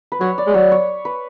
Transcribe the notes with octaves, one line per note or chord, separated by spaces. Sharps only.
B4
F#3 C#5
D5
G#3
F#3 C#5
C#5
B4